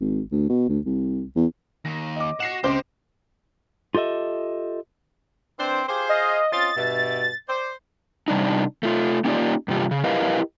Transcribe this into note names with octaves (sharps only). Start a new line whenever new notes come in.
G#1
D2
B2
D2
C2
E2
D#2 A#6
D#5 D6
F#4 F#5 A#6 C7 E7
C#2 C4 G4 C5 D6
F4 G4 A4 D#5 E5
E3 C4 D4 C5
F4 G4 G#4 C5
D#5 F5
C4 C#4 F4 D#5 A6
G2 B2 E5
C5 D5
C3 G3 D4 D#4
A3 F4
A#3 C#4 D#4 F4 G4 D5
G2 C3 G3 F4
C#3
E4 G4 A#4 B4 D#5 F5